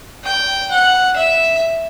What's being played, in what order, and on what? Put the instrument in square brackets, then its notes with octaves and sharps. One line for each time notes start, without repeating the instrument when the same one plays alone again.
[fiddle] G5
F#5
E5